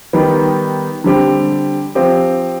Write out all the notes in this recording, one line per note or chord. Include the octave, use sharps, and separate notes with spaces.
D#3 G3 B3 D#4
D3 G3 C4 G4
F3 C4 G4